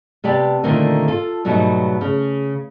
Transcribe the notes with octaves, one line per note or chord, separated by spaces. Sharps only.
C3 B3 G4 D5 A5
A#2 D3 D#3 A3 A#3 C4
F4 A4
G#2 B2 F#3 G3 A3 D#4
C#3